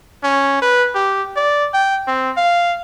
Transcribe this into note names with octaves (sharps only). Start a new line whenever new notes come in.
C#4
B4
G4
D5
G5
C4
F5